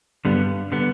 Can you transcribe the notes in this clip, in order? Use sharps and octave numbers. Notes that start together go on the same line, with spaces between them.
G2 D3 G3 B3
D3 G3 B3